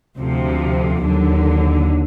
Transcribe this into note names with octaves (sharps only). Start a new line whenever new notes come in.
D2 C3 F3
D#2 D3 F#3